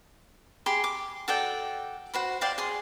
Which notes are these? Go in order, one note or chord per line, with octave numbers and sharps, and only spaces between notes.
G4 G#4 B5 C6
D6
F#4 A4 D5 G5
F#4 C5 B5
C5 D5 F5 G5
G#4 C6